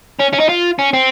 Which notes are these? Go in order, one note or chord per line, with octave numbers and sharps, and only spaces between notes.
C#4
C#4
D#4
F4
C#4
C4